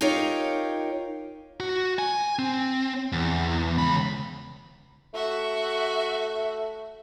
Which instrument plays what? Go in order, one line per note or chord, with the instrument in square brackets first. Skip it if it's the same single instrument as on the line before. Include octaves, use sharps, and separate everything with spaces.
[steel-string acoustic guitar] D#4 F4 G4 A#4 C#5
[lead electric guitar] F#4
G#5
C4
E2
C#2 B5
[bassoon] A3 [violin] F#4 E5